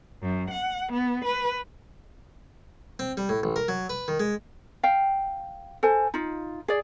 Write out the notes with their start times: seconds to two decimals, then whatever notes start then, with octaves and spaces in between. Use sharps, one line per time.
0.22 F#2
0.51 F#5
0.92 B3
1.25 B4
2.99 C4
3.17 G3
3.29 A2
3.43 A1
3.56 A#4
3.68 F#3
3.90 B4
4.08 D#3
4.20 G#3
4.83 F5 G5
5.83 A4 C5 G#5
6.14 D#4 F4
6.68 G#4 D5